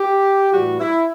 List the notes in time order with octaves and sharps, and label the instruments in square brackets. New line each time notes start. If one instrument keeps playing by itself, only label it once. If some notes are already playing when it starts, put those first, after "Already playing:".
Already playing: [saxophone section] G4
A2 E3 G3 F#4
E4